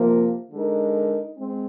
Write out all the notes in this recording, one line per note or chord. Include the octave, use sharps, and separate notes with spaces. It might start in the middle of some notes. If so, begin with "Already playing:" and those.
Already playing: C3 F3 A#3
D3 G#3 D#4 A#4
G#3 C4